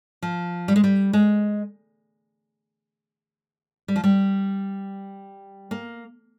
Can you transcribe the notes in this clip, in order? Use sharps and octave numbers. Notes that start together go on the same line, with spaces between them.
F3
G3
G#3
G3
G#3
G3
F3
G3
A#3